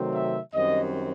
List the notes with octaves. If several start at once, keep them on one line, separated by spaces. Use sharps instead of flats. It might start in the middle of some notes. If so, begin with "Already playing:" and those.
Already playing: C3 D#3 F#3 A3 C4
E5
F#2 D#3 G3 C4 D#5